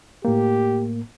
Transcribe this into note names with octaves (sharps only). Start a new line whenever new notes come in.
A2 A#3 G4